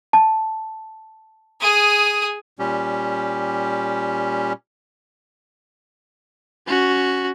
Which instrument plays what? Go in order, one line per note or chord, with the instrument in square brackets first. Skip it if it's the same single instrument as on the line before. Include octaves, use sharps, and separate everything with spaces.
[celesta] A5
[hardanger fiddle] G#4 D#6
[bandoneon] A#2 G3 C#4 G4
[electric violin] C#4 F#4